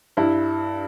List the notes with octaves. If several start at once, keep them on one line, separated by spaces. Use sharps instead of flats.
G2 E4